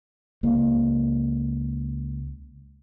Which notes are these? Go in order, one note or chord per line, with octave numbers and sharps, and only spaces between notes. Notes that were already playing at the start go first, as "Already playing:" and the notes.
C#2 A#3